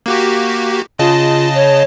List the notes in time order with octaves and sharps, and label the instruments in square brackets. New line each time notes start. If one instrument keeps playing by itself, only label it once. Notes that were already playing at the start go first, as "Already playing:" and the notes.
[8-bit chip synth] A#3 F#4 G4
[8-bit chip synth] C#3 D#5 A5 [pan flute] F4
[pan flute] C#5